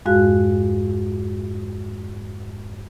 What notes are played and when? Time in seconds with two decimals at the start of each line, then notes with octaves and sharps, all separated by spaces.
0.06 F2 G#2 G#3 F#4 F5 F#6